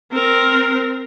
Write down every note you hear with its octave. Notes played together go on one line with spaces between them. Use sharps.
C4 A#4